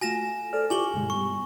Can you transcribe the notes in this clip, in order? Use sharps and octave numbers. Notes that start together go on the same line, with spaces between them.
A3 F4 F#4 G#5 A#6 E7
A4 C5 D5 F6
E4 F4 G4 G#5 C#6 D6 F#7 G7
G2 B2 D3 G#3
G3 B3 C#6